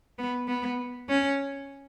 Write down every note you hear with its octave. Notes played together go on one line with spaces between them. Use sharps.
B3
B3
C#4